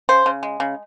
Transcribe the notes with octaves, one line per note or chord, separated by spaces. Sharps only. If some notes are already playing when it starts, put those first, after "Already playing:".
C#3 C5
C#3
G#3
C#3